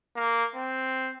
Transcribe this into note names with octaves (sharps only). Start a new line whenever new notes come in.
A#3
C4